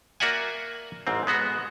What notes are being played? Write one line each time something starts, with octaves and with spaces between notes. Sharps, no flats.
A#3 F#4 D5 E5 F#5 G#5
A1 G#2 C4
G#3 B3 F#4